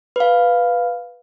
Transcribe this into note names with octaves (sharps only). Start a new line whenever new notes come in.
B4 F5